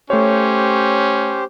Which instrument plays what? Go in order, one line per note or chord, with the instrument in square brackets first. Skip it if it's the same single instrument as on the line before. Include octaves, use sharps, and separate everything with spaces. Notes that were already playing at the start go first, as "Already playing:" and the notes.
[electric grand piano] A3 C#5 [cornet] C#4 [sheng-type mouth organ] G4 C5